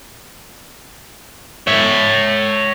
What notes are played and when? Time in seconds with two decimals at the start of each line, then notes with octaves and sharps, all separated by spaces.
1.67 C#5 E5